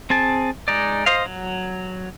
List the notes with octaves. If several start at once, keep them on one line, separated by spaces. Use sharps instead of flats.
C4 G#4 A5
G#3 D#4 D5
C5 D#5 F5
F#3